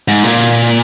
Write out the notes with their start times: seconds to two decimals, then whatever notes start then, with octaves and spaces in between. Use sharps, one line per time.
0.08 G#2
0.24 A#2